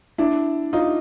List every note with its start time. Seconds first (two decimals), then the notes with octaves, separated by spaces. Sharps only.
0.18 D4 E4
0.73 D#4 F4